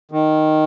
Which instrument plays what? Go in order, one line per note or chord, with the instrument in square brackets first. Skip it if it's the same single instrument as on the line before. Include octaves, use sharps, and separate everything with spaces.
[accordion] D#3